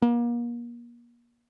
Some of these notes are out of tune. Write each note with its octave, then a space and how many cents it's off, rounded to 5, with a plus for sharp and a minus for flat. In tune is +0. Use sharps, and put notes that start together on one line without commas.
A#3 +35